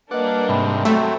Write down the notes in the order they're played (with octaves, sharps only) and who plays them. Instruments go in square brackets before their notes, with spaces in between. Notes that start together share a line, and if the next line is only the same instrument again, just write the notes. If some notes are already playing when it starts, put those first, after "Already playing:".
[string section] G3 A#3 D4 [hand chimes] B4 D#5 [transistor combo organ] D5 F#5
[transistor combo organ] G#2 C3 [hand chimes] E5 G5 B5
[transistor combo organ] F#3 C4 [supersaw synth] A3